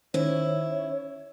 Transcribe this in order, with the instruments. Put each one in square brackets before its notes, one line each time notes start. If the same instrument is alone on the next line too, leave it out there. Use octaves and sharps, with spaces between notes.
[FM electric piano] D#3 C#4 [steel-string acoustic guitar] E4 [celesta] C5 [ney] C#5